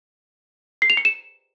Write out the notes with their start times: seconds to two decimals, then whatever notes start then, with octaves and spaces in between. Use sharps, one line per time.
0.82 C7
0.90 F7
0.97 C#7
1.05 E7